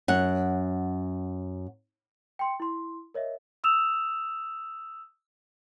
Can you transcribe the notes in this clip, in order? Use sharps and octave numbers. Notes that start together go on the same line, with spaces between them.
F#2 F#5
G5 C6 C#7
E4 C6
A#4 C#5 D#5 E5
D#6 E6 E7 F7